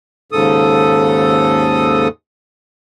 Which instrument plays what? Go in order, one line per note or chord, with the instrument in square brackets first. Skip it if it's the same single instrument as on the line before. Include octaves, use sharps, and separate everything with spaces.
[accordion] D#2 G#2 C#3 A4 D#6